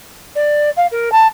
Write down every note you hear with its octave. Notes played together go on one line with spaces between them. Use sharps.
D5
F5
A#4
A5